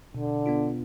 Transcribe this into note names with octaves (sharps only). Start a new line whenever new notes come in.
B2 D3
B3 D4 F4